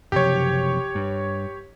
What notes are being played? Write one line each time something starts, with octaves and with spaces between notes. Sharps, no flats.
F#1 C3 F3 G4 C#5
G2